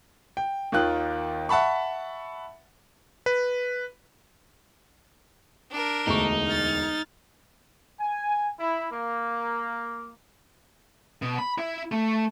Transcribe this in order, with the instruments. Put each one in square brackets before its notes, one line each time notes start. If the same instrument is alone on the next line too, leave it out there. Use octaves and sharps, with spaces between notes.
[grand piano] G5
D#2 D#3 F4 F#6
E5 F#5 A5 B5 C#6
[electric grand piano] B4
[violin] D4 A#4
[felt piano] E1 D2 C#6 [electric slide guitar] D#4
[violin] F6 A6
[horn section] G#5
E4
A#3
[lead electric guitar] B2
B5
E4
A3